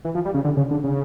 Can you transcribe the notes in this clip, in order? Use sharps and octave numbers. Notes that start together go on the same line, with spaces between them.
E3
F3
G3
C#3
D3
C#3
D3
C#3